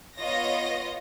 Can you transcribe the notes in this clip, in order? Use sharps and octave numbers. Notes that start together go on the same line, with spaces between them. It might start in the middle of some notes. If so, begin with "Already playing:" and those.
B3 F4 C#5 D#5 A#6